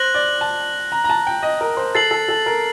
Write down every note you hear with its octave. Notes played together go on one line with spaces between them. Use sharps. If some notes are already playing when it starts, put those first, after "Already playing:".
Already playing: C5 F#6 A#6 F#7
D5
A5
A#5
A#5
A5
G5
D#5
A#4
C5
A4 A6 C7 F#7
A4
A4
A#4